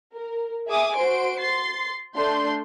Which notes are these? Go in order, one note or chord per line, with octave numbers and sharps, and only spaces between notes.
A#4
G#4 E5 G#5 D6 D#6
F#4 C5 C6 D7
C6 A6 C7
A3 D4 C6 G6